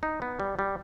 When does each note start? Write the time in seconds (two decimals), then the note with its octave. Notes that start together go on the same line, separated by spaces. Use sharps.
0.03 D#4
0.22 B3
0.40 G3
0.59 G3